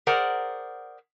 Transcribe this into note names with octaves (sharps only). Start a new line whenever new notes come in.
G#4 A#4 C5 D5 F#5 A#5